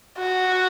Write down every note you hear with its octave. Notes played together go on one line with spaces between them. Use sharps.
F#4